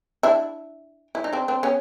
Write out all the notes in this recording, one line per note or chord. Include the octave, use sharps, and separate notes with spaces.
D4 E4
E4
D#4
C4 D4
C4 D4
B3 C#4